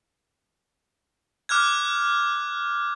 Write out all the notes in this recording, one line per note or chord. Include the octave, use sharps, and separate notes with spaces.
D6 F6 F#6 G#6